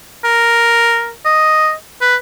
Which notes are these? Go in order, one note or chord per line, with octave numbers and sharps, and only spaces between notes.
A#4
D#5
B4